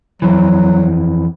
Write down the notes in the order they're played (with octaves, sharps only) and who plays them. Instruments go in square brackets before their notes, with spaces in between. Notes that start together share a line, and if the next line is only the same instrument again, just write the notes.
[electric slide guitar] F2 E3 [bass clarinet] F#3